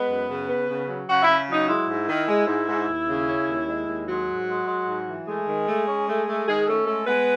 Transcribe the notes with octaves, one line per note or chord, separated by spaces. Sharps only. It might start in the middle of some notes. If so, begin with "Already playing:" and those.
Already playing: G#3 B3 B4
F#2
C#3
B3
C#3
F#3
C#3 F#4 F#5
C#3 E4 E5
F#3 D#4
G#3 E4
G#2
D#3
G#3
G#2
G#2
D#2
C#3
C#4
D#2
G#3
D#2
F#3 G#3 F#4
G#2
G#3
G#3
G#2
E3
G#3 A3 G#4
D#3
A3
C#4
A3
A3
D#3 G#3 G#4
A3 C#4 A4
G#3 A3 A4
G#3 B3 B4